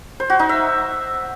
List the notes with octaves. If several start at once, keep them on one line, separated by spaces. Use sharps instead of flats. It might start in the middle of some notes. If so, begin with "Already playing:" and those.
C5
F#4
D#4
E5